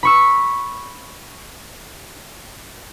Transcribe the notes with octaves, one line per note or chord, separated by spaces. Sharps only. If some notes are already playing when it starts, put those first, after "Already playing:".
B5 C#6 E6